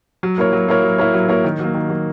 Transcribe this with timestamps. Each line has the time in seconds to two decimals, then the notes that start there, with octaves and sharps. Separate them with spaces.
0.23 F#3
0.38 A#3 E4 A#4 C#5
0.53 F#3
0.68 A#3 E4 A#4 C#5
0.83 F#3
0.98 A#3 E4 A#4 C#5
1.14 F#3
1.29 A#3 E4 A#4 C#5
1.44 D#3
1.59 F#3 A#3
1.74 D#3
1.89 F#3 A#3